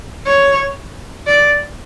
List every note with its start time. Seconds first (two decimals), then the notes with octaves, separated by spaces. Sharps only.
0.26 C#5
1.27 D5